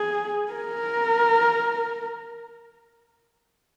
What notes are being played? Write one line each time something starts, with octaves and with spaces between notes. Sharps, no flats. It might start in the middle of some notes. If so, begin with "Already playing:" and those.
Already playing: G#4
A#4